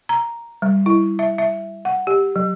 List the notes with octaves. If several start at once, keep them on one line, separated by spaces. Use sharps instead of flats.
A#5
G3
E4
E5
E5
F#5
G4
F#3